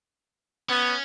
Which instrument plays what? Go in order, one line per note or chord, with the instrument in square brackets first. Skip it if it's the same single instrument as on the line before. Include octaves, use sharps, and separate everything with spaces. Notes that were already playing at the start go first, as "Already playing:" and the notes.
[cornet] B3 [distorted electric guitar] C#4